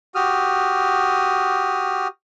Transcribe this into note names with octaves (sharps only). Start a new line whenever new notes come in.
F#4 G4 D#6 F6